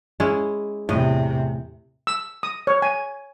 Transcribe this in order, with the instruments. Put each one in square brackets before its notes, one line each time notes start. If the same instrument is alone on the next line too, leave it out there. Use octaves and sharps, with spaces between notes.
[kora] G#3 C#4 E4
[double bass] E2 C3 [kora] A2 D#5
[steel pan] E6
D#6
C#5
G#5